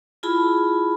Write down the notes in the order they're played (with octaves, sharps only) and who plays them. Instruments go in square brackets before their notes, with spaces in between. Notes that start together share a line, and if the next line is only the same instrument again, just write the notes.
[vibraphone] E4 F4 G#4 A5 B5